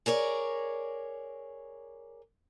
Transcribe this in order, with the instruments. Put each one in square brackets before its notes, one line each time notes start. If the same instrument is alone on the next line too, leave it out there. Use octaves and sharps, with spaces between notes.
[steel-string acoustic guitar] G#4 A#4 C#5 D5